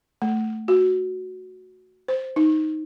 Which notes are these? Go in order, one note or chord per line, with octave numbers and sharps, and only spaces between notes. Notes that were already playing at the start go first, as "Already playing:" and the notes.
A3
F#4
C5
D#4